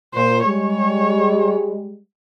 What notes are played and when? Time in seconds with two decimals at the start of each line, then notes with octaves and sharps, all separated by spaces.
0.14 A#2 C5
0.44 G3 G#3 C#5